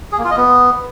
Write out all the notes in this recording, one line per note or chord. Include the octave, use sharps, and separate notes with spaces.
G#4
A#3
F4
D#5
B3